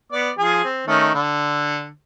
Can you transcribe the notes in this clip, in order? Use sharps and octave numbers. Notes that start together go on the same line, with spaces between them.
B3 D5 D6
F3 G#4 G#5
C4
D#3 A3 C#4
D3